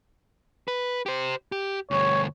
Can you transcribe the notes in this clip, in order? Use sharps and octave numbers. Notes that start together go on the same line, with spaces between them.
B4
G4 C5
G4
D2 G2 C#5